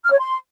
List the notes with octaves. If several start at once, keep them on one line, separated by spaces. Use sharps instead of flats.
F6
C#5
C6